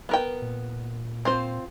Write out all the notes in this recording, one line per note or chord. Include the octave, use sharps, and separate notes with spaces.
B3 A#4 G5
A#2
C4 F4 C5